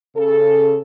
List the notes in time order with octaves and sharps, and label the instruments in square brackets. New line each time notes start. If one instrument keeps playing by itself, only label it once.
[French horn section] C#3 A4